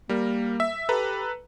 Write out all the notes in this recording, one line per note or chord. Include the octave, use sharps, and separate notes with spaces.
G3 A#3 A#4
E5
G4 A4 B4 A#5